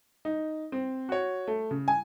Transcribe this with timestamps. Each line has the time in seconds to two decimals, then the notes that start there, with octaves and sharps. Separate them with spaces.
0.25 D#4
0.72 C4
1.09 F#4 C#5
1.47 A3
1.71 C#3
1.88 G#5